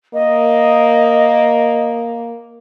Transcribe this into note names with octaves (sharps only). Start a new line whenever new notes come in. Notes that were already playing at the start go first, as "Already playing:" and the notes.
A#3 D#5